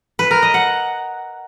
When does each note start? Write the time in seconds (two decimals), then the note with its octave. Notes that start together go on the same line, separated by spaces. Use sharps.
0.19 B4
0.31 A#4
0.42 D#5
0.54 F#5